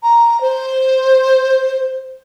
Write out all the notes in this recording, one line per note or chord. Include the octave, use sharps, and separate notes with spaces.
A#5
C5